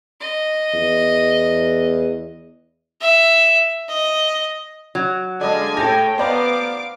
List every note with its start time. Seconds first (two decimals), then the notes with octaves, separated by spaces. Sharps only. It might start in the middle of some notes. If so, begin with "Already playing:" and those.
0.20 D#5
0.73 E2
3.02 E5
3.89 D#5
4.95 F#3
5.41 D3 G#3 D5 D#5 F5 G#5 A5
5.77 A2 G4 A4 C#5 G5 A5 A#6
6.18 B3 C5 D5 F5 A#5 D6